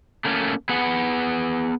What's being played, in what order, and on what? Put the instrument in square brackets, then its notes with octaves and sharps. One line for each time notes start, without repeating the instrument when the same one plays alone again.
[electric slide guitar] A3 A#3 C#4
B3 G#4 B4 F#5